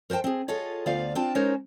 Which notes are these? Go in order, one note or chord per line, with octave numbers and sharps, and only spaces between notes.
A#4 C5 D5 G5 A5
C4 G#4
F4 G#4 A4 C#5 D#5
D2 B3 F4 C5 D5 F5
C4 D4 F4 G5 A5
G#3 C#4 D#4 A#4 C5 C#5